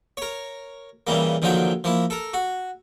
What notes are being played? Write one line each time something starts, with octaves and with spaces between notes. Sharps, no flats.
A#4 C#5
A#2 C#3 E3 G3 A#3
A#1 D3 D#3 F3 F#3 G5
F3 A#3 E4
A4 A#4
F#4